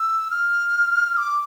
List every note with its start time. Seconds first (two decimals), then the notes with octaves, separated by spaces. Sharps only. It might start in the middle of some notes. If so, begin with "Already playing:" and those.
Already playing: E6
0.31 F6
1.17 D6